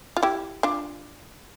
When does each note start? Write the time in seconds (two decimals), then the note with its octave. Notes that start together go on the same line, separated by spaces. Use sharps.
0.17 F4
0.23 E4 G4
0.63 D4 F4